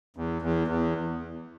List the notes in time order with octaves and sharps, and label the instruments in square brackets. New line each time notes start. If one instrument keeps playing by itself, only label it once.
[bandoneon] E2
E2
E2